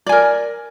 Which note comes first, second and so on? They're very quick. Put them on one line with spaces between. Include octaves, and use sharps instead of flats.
D5 G#5 A#4